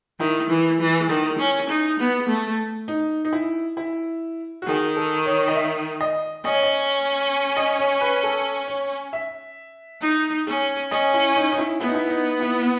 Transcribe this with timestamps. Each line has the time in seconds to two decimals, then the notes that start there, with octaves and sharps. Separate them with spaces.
0.19 D#3 E4
0.49 E3
0.80 E3
1.10 D#3
1.38 C#4
1.69 D#4
1.99 B3
2.28 A3
2.88 D#4
3.25 D#4
3.33 E4
3.77 E4
4.62 F#4
4.66 D#3 G#4
4.96 A4
5.26 C#5
5.48 D#5
5.56 E5
6.01 D#5
6.45 C#4 D#5
6.54 C#5
6.63 D#5
7.57 D#5
7.79 C#5
8.01 B4
8.23 A4
8.68 C#5
9.13 E5
10.01 D#4
10.47 C#4
10.91 C#4 D#5
11.13 E4
11.36 D#4
11.53 D#4
11.58 E4
11.80 B3 E4
11.88 D#4
11.95 E4
12.10 D#4
12.40 E4